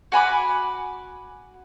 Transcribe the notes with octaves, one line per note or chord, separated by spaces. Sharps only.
F#4 G#5 B5 D6